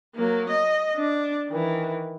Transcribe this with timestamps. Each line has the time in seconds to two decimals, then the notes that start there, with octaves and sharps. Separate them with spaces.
0.15 F#3 A#3
0.49 D#5
0.96 D4
1.48 D#3 E3